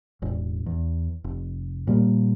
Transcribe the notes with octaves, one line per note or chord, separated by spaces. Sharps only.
E1 A1
E2
F1
A#2 G3 A#3